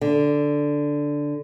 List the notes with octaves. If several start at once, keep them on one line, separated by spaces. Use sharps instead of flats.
D3